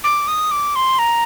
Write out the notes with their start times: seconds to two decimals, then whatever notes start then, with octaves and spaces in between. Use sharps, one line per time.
0.04 D6
0.28 D#6
0.51 D6
0.76 C6
0.99 A#5